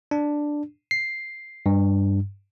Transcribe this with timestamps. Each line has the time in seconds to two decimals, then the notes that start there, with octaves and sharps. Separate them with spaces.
0.11 D4
0.91 C7
1.66 G2